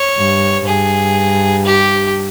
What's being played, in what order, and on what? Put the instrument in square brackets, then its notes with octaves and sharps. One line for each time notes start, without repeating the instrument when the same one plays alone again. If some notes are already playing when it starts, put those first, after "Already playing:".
Already playing: [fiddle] C#5
[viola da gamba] G2
[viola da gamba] G2 [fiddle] G#4
[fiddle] G4